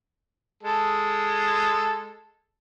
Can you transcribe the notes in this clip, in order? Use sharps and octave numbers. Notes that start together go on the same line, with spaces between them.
G#3 A4